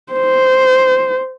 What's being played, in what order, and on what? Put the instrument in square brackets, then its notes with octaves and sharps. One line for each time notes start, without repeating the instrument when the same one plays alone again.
[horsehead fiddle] C5